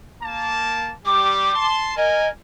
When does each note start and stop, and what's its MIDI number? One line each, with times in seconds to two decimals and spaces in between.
0.21 0.92 58
0.21 0.92 81
1.06 1.51 55
1.06 1.51 67
1.06 1.67 86
1.55 1.94 81
1.55 1.94 84
1.97 2.28 70
1.97 2.28 75
1.97 2.28 80